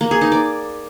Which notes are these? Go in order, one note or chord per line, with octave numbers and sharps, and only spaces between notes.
A#3
G#4
D#4
D5